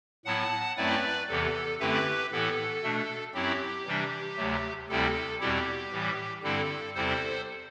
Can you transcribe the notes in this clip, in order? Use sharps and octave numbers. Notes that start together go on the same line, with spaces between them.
A2 F#3 B3 E4 F#5 A5
F#2 F#3 A3 C4 E4 B4 D5
E2 C3 E3 B3 A4
F#2 D3 A3 C4 E4 G4 B4
A2 E3 B3 E4 A4
B2 A3 D4
F#2 F#3 C4 E4 G4
C3 E3 G3 D4
D2 C3 F#3 A3
D2 C3 G3 C4 E4 A4
E2 B2 G3 C4 E4 G4
A2 E3 G3
G2 D3 G3 C4 E4 A4
E2 C3 G3 C4 E4 A4 C5